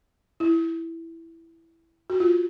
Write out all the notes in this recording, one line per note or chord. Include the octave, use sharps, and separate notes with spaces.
E4
F#4
F4